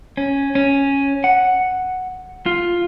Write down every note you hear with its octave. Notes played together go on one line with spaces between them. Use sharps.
C#4
C#4
F#5
F4